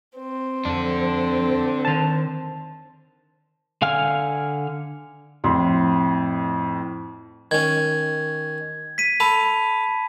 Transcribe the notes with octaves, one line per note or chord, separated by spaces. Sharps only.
C4
F2 D4 A4
D#3 A5
D3 F5 G#5 F6
F2 A2 C6
D#3 C#4 G#6
B6 D#7
A4 A5 B5